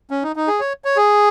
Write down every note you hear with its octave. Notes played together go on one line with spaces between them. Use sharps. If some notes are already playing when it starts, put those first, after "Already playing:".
C#4
D#4
D#4
G#4
C#5
C#5
G#4